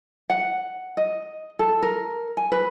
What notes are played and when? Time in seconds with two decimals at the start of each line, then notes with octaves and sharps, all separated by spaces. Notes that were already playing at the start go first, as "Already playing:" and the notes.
0.30 F#5
0.97 D#5
1.59 A4
1.82 A#4
2.37 G#5
2.52 B4